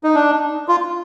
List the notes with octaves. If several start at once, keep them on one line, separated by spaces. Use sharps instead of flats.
D#4
D4
F4